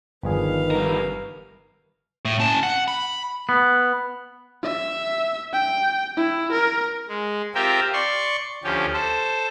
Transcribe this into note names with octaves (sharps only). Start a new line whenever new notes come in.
G1 D#3 F3 G#4 B4 F5
G3 A#4
A2
C#4 A5
F#5
B5
B3
E5
G5
E4
A#4
G#3
C4 F4 G4 A#4 E5 G5
D5 C6 C#6
D2 F3 C#4 G4
A4 C5